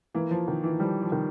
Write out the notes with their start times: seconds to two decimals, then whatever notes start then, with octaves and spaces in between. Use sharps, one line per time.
0.14 E3 A#3
0.31 F3
0.48 D#3
0.64 E3
0.80 F3 G3
1.02 F3
1.12 D#3